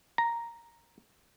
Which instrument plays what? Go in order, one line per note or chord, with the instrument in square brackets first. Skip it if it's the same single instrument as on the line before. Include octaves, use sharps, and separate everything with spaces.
[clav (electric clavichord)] A#5